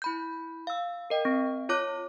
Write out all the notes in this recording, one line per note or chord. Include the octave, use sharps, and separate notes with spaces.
E4 B5 G6
F5 E6
A#4 D#5 G5
C4
F4 C#5 D6 F#6